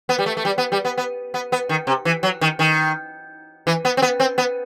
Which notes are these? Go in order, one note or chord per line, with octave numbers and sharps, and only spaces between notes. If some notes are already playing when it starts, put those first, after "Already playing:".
B3
G3
A3
A3
G3
B3
G3
B3
B3
B3
B3
D#3
C3
E3
F#3
D#3
D#3
E3
B3
C4
B3
C4
B3